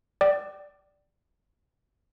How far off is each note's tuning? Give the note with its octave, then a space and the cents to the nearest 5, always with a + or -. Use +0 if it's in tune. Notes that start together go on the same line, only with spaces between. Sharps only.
D5 +0 G5 -30 D6 +15